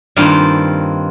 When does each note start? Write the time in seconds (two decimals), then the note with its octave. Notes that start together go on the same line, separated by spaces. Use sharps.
0.16 G2 D#3 A#3 C4 F4